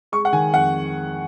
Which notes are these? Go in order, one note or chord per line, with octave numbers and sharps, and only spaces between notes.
G#3 C#6
F#5
D#3 G#5
F2 F#5